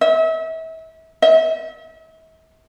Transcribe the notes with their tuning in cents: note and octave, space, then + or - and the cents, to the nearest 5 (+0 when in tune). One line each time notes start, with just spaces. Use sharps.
E5 -35
E5 -45